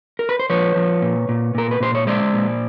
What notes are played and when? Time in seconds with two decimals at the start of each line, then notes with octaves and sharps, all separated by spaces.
0.19 A#4
0.29 B4
0.40 C5
0.50 F3 B4 C#5
0.76 F3
1.02 A#2
1.29 A#2
1.55 A#2 A#4
1.71 B4
1.80 A#2 C5
1.95 C#5
2.07 G#3 C5 D5
2.33 A#2